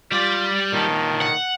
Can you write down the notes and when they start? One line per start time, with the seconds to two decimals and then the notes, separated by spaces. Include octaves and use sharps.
0.12 G3 F4 D5
0.73 A#2 D#3 A4
1.22 F#5